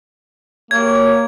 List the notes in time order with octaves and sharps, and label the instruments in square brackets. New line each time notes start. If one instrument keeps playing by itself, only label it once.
[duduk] A#3 [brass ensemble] F#4 G4 C#5 [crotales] G#6